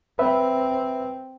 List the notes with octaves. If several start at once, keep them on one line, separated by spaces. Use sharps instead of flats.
C4 B4 E5